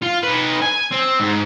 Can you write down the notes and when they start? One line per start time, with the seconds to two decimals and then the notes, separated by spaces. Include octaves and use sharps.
0.03 F4
0.24 D#4 B4
0.62 G#5
0.91 C4
1.20 G#2